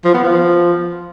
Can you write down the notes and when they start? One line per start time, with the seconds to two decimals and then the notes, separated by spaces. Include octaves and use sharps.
0.05 F3
0.14 B3
0.24 F3